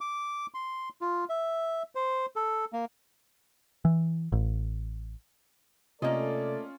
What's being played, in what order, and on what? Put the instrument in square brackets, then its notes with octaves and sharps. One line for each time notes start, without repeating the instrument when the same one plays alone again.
[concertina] D6
C6
F4
E5
C5
A4
A#3
[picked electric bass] E3
A1
[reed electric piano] C3 [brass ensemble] A3 A4 D5 [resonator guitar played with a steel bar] A#3 D#5 [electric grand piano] C#4 F4